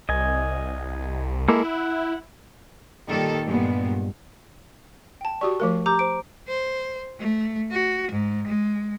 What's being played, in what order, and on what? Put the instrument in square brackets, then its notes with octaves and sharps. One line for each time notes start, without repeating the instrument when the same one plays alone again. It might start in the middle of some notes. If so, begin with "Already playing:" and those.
[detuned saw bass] C2 [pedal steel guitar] D#5 G#5
[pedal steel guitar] G#3 A#3 A4 [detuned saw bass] E4
[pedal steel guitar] F#5
[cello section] A#2 D#3 G3 G4 A4
G2 A#2 G#3 B3
[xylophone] G5 A5
[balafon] F#4 G4 D5 [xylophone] C#6
[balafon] F3 A3 A#4
[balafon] G4 [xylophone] A#5 D6 G6
[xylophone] C5 D7
[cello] C5
A3
F#4
G#2
G#3